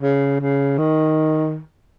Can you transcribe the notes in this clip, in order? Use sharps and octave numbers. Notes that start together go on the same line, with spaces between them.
C#3
C#3
D#3